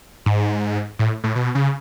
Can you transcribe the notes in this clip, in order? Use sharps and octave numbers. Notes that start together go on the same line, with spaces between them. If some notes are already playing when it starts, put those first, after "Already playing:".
G#2
A2
A2
B2
C#3